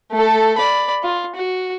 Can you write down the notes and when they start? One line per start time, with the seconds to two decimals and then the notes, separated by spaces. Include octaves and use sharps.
0.11 A3 A4
0.57 D5 B5
1.03 F4
1.36 F#4